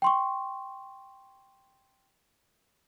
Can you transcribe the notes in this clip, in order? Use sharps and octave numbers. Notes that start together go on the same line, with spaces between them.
G5 C6 C#6